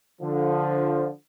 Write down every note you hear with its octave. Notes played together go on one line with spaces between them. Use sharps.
D3 F3